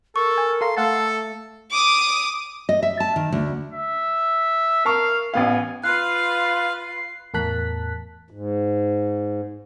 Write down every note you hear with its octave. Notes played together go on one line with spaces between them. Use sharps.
A4 A#4 C#6
G#5
A4 F5 A#5 C6
A3 A4 F5 F#5 A5
D6 D#6
D#5
E5
A5
D#3
D2
E5
A#4 F5 A5 C#6
A1 B3 F5 G#5
F4 B4 F5 F#6 C7
E2 A2 A#4 A5 F#6 B6
G#2